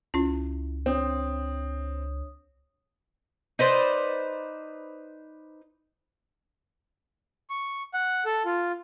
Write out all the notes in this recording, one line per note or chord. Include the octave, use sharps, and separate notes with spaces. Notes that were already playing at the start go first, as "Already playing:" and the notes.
C#2 C#4 E4 F4
C4 D4 C#5 D#6
D#4 B4 C5 D5
C#6
F#5
A4
F4